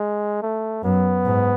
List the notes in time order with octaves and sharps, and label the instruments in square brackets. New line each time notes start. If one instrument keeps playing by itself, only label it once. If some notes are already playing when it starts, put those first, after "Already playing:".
Already playing: [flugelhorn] G#3
A3
[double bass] F#2 [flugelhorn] B3
[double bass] G#2